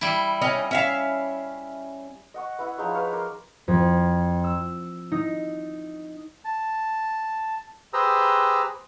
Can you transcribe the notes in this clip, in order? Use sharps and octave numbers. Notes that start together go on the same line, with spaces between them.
G3 E4
C#4 D#4 D#5
C#4 E5 F5
D#5 F#5 C#6
B3 E4 F#5
F3 D#4 G#4 C#5
B4 C#5 F5
A#4 C6 D6
F2
E6
D#4
A5
G4 G#4 B4 C5 A#5 E6